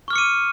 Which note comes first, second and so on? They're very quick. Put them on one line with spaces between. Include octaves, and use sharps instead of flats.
C#6 F6 D6 C#7 D#7